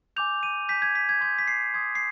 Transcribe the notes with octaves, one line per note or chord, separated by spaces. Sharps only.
G#5 D6 G6 F7
D#7
G#5 D6 G6 B6
G#6
B6
G#6
C6 D#6 G6 G#6
B6
C7
C6 D#6 G6 G#6
C7